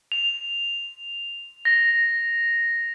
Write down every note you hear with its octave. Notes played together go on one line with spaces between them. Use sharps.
F7
A#6